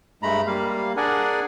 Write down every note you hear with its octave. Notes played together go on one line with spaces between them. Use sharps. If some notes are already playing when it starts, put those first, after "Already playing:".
G2 G#3 A3 A#5 B5
G3 A#3 F5
D4 G#4 A#4 D5 F#5 G#5